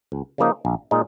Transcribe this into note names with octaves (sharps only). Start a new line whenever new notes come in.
C#2
C#3 F3 A#3 D#4
A#1
A#2 G#3 D#4